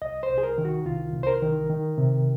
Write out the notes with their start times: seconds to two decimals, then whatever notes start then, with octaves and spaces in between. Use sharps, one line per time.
0.02 C2 D#5
0.23 C5
0.29 C2
0.38 G#4
0.43 A#4
0.58 D#3
0.65 F#4
0.86 C2 F4
1.13 C2
1.23 C5
1.27 A#4
1.42 D#3
1.70 D#3
1.98 C3